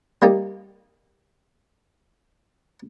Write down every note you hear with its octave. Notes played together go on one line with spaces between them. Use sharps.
G3 A#3 D#4 G4